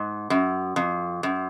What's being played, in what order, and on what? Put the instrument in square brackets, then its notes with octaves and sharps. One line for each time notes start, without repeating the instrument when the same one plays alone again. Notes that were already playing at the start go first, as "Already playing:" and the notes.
Already playing: [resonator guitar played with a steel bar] G#2
F#2
F2
F#2